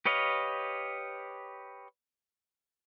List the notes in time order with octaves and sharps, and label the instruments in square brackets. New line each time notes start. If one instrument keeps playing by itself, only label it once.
[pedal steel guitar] G4 B4 C#5 D#5 F5